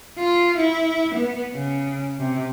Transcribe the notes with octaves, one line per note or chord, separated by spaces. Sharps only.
F4
E4
B3
C#3
C3